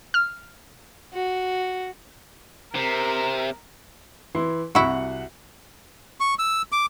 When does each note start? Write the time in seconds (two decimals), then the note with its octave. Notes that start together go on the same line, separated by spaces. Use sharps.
0.14 F6
1.13 F#4
2.75 C3 A#4
4.35 E3 E4 C6
4.75 C2 E4 F#4 F#5
6.20 C#6
6.39 E6
6.72 D6